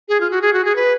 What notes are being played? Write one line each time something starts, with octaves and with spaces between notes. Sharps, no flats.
G#4
F4
F#4
G#4
F#4
G#4
B4